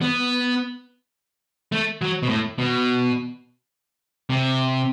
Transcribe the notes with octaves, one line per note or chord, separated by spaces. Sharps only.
B3
A3
F#3
B2
A2
B2
C3